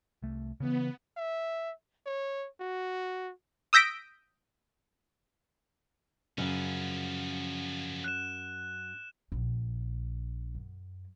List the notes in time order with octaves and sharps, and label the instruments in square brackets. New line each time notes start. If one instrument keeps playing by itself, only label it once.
[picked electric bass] C2 A3
[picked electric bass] C#3 E3 [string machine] B3
[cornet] E5
C#5
F#4
[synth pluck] D#6 E6 G6 A#6 B6 D7
[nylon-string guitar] F#2 [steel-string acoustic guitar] C#3 [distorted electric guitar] F3 C#4
[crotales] F#6 E7
[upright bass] A#1
F#2